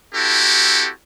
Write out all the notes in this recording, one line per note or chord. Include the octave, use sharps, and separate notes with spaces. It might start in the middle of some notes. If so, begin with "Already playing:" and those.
C4 E4 F#4 G4 A4